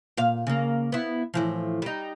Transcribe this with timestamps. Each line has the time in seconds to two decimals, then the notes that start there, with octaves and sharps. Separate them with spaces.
0.17 A#2 F5
0.47 C#3 A#3
0.92 B3 E4
1.34 A2 E3 F3
1.82 G3 D#4